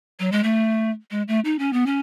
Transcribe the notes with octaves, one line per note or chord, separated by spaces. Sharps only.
F#3
G#3
A3
G#3
A3
D#4
C#4
B3
C#4